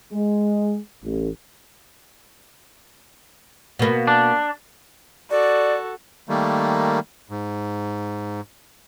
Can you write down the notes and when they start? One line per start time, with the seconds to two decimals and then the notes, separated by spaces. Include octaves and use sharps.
0.13 G#3
1.04 A1
3.79 B2 A#3
4.07 D4
5.31 F#4 A4 D5
6.29 D#3 G3 A3 A#3
7.30 G#2